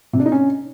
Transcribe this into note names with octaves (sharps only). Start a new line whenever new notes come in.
C3
D4
D#4
C#4